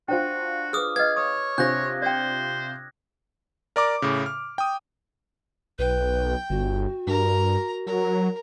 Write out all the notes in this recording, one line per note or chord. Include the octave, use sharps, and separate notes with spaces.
D4 F4 F#4 C5 G5
G#4 B4 D6 D#6 F6
B4 D#5 F5 G#6
C#5 D#6
C3 D4 F4 C5 C#6 F#6 A#6
C5 D5 G5
A#4 D5 A#5 D6
A2 C#3
F6
G5 D#6
B1 B4 G5
G1 F#4
G2 A#4 A#5
F#3 A#4